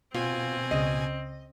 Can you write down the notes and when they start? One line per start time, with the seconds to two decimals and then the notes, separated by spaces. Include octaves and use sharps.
0.14 B2 C4 F4 G#5
0.71 C#2 C#3 D#5